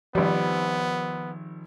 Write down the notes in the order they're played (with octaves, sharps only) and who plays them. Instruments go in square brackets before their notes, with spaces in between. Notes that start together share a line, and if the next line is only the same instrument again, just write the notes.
[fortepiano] G#1 G3 [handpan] D#3 F3 [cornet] B3